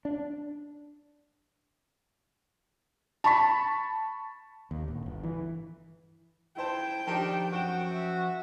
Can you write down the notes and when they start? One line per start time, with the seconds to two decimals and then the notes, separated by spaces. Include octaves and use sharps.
0.05 D4
3.24 A5 B5 C#6 B6
4.71 D#2
4.88 D1
5.06 G1
5.23 E3
6.57 E4 C5 G5 A5
7.07 D#3 F3 D4 G4 A5
7.52 F#2 F#4 E7
7.90 E5